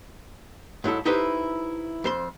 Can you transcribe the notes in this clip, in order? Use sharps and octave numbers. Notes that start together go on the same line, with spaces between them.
G#2 F#3 E4 A4
D#4 E4 G4 A4 B4 C5
F2 C5 C6